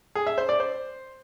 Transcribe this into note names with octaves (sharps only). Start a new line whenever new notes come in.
G#4
E5
C5
D5
C5